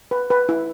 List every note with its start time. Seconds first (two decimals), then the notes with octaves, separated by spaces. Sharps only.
0.11 B4
0.30 B4
0.49 E4